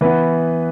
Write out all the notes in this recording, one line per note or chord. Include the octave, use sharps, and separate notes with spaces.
E3 B3 B4